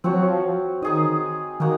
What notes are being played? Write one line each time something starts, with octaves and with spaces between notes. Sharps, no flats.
F3 C4 F#4 C#5
F#3
F3
D#3 D#4 G#4 D#5
D#3 A#3 D#4 F#4